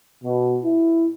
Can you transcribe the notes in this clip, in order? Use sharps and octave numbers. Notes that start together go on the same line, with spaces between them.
B2
E4